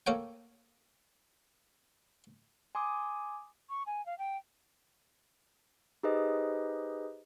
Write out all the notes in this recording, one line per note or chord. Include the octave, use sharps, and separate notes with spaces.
A#3 A4 A#4 C#5 F#5 G5
G#5 C6 D6 D#6
C#6
G#5
F5
G5
D#4 G4 G#4 B4 C5 D#5